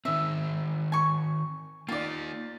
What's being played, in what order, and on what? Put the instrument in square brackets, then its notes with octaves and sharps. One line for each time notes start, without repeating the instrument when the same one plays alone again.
[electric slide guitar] D#3 C4 [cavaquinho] E5
[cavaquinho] G#5 C#6
[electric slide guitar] A#3 D#4 [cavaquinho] F4 D5